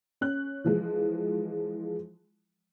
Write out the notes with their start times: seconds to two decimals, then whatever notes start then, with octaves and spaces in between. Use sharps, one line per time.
0.21 C#4 F#6
0.64 E3 F3 G#3